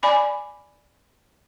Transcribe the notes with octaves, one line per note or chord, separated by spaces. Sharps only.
D5 G#5 B5 D6